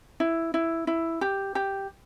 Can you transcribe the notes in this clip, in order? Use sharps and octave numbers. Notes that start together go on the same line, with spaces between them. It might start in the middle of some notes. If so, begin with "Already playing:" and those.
E4
E4
E4
G4
G4